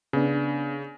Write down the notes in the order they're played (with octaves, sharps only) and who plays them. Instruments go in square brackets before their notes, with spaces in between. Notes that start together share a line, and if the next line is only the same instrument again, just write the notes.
[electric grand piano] C#3 [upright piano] B3 D4